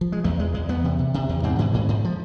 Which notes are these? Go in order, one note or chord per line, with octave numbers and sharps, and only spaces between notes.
F3
G#3
E2 A3
E2 G#3
E2 G#3
E2 B3
C3
C3
C3
E2
G#2 C4
G#2 D3
G#2 E3
G#2 F3
F3